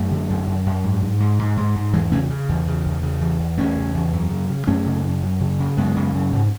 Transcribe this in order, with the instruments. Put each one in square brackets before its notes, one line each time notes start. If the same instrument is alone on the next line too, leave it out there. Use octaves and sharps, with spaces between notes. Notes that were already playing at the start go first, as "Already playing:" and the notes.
Already playing: [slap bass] F#2 F#3 A3
D3
F#2
F#2
F#2
G#2
G#2
G#2
G#2
G#2
G#2
E2 E3 G#3
C#3 A3 C#4
C#3
E2
C#3
E2
C#3
E2
E2
E2 A3 C#4
C#3
E2
F#2
C#3
C#3
F#2 A3 C#4
C#3
F#2
F#2
C#3
C#3
F#2 G#3 B3
C#3
F#2
G#2